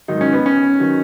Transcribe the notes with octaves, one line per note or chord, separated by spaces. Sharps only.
G#2 D#3 F#3 D#4
C#4
B3
C#4
D#3 F#3